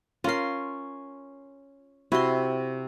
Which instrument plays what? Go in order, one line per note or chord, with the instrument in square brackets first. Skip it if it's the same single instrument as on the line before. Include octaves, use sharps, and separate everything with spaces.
[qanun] C#4 C6 [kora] F4 A#4
[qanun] C3 C6 [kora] E4 F#4